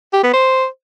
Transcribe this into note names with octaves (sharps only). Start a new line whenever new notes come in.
G4
B3
C5